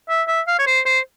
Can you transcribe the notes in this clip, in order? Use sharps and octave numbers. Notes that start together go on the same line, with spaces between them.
E5
E5
F5
C#5
C5
C5